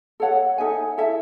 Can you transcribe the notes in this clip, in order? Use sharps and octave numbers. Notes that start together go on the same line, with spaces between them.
A4 C#5 F#5
D#4 A4 E5 G#5
E4 A4 E5